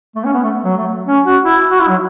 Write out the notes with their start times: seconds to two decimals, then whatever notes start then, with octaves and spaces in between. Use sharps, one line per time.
0.16 A3
0.24 C#4
0.34 B3
0.43 A3
0.65 F#3
0.77 A3
1.07 C#4
1.25 F#4
1.44 E4
1.71 F#4
1.80 E4
1.89 F#3